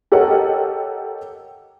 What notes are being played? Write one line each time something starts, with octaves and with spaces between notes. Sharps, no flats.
G4 A4 A#4 C#5 D#5 F#5